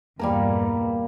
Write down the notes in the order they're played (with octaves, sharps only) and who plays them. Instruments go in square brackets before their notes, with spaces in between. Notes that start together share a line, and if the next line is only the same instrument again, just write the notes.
[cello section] E2 G2 A#2 [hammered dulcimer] G3 A#3 A#4